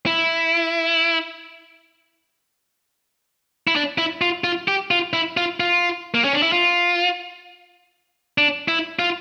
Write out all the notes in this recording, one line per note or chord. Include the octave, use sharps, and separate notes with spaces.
E4
E4
D4
E4
F4
F4
G4
F4
E4
F4
F4
A#3
C#4
D4
E4
F4
D4
E4
F4